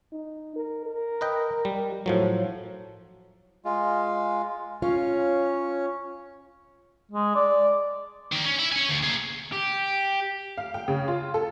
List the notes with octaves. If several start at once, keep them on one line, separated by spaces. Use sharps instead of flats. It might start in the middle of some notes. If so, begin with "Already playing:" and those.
D#4
A#4
A#4
B4 D#5 G5
G3
A2 F3 F#3 A3
G#3 F4
C#4 F4 C#5 F5
G#3
D5
D#3 A#3
C#4
E4
C#5 G#5
D2
A#3 G#4
G4
F5
G5
C#3
F4
A4